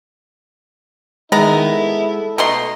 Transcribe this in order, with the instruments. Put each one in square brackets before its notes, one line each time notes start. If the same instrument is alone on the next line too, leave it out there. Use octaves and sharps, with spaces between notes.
[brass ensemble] D#3 [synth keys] G#3 [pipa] B3 A#5 [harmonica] E4
[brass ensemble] A4
[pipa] B2 A3 C6 [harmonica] D#5 A#5